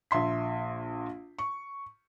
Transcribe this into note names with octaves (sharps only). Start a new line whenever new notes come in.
A#1 E5 C6 B6
C#6